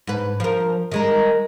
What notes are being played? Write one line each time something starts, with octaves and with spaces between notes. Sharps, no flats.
G#2 B4
F3 A#4
D#3 G#3 A#4